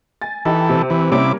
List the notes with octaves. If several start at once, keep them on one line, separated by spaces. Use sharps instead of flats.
G#5 A6
E3 D#4 G4 A4
C3
E3
C3 G3 A#3 C#4 E4 D6